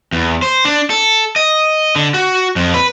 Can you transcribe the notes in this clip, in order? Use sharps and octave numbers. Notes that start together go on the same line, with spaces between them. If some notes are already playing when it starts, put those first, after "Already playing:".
E2
C5
D4
A4
D#5
D3
F#4
F2
B4